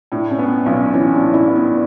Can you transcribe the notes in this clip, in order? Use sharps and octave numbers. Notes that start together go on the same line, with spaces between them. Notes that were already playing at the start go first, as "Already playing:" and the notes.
A2 D4
C#4
B3 D4
B1 C#4
E3 C#4
D4
A2
E4
B3
D4